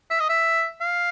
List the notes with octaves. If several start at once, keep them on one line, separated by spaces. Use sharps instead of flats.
E5
D#5
E5
F5